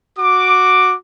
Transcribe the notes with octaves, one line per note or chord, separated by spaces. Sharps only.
F#4 D6